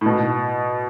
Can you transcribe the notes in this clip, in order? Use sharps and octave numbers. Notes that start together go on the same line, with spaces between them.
A2
B2